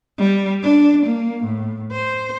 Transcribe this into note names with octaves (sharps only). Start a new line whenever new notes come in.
G3
D4
A#3
A2
C5